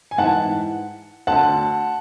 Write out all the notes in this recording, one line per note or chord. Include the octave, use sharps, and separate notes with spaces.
G#5
G#2 E3 F#5 A5
D2 D3 F#5 A5